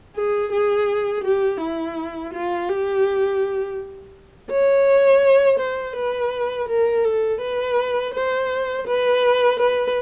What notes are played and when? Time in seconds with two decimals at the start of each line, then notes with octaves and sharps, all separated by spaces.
0.16 G#4
0.53 G#4
1.24 G4
1.62 E4
2.34 F4
2.69 G4
4.51 C#5
5.60 C5
5.96 B4
6.69 A#4
7.05 A4
7.42 B4
8.14 C5
8.87 B4
9.59 B4